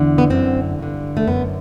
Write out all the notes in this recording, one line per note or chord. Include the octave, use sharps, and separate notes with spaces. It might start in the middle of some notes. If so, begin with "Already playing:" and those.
Already playing: E2 D3
B3
F#2 D3 C4
G2 D3
A3
F#2 D3 B3